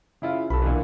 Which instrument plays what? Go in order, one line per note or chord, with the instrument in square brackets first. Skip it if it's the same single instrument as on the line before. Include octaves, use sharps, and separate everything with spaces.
[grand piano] C#3 E4 F4
[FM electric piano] B1 [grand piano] A4 B5
[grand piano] A#2 D3 E3